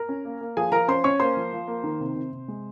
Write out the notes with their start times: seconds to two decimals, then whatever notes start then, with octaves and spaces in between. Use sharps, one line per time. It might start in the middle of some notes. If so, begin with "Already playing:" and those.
Already playing: A#4 A#5
0.09 C#4
0.25 A#3
0.41 A#3
0.57 F3 G#4 G#5
0.72 F3 A#4 A#5
0.88 C#4 C5 C6
1.04 C#4 C#5 C#6
1.20 A#3 C5 C6
1.37 F3
1.53 F3
1.68 A#3
1.84 D#3
2.00 C3
2.16 C3
2.33 C3
2.48 G#3